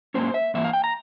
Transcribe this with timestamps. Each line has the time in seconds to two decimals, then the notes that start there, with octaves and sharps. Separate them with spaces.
0.14 G#2 E3 A#3 C#4 C5
0.34 E5
0.54 G#2 E3 A#3 E5
0.64 F5
0.73 G5
0.84 A#5